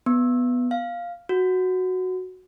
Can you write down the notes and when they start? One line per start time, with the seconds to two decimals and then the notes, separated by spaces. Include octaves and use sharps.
0.06 B3
0.71 F5
1.29 F#4